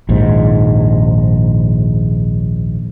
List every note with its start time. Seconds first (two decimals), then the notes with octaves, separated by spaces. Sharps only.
0.09 A#1 D#2 G#2